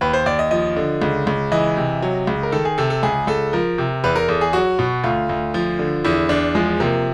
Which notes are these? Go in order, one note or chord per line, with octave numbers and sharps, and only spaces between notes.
D#2 B4
C5
D#2 D5
D#5
F3 D#5
D3
C#2
C#2
E3 D#5
C3
F#3
C#2
A#4
D#3 A4
G#4
C3 A4
A4
C#2 G#4
C#2 A4
F3 A#4
C3
E2 B4
A#4
E2 A4
G#4
F#3 F#4
B2
D2 F4
D2
F3
D3
E2 E4
E2 D4
F3 G#3
C3 A#3